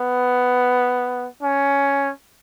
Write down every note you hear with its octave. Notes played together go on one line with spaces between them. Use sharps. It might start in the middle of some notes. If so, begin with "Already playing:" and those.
Already playing: B3
C#4